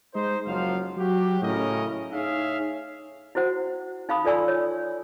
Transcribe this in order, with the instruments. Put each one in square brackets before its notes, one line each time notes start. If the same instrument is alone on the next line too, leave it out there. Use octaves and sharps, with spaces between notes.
[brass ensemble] G#3 D#4 C5
F#1 F3 F#3 F5
F#3 F#4 G4
A2 C#3 C#4 A#4 D#5
D#4 G#4 C#5 E5 F5
[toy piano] E4 F#4 C5 F#5
D#4 F5 B5 D#6
F4 A4 D5 G#5 C6 E6
C#5